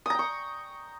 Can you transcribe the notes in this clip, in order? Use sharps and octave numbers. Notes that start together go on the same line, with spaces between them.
G5 A#5 C#6 D#6